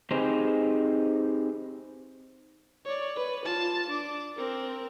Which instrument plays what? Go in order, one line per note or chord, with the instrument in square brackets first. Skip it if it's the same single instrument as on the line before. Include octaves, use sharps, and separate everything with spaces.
[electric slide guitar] C4 D#4 G4 G#4 B4 C5
[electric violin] C#5 D5
B4
F4 A5
D4 D6
C4 A#4